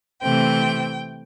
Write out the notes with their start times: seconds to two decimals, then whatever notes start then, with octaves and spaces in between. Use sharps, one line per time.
0.21 C3 E3 A3 C4 G5